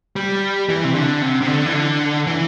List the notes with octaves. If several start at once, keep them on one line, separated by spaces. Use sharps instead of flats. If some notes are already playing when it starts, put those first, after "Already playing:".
G3
E3
C3
D3
C3
C3
D3
E3
D3
E3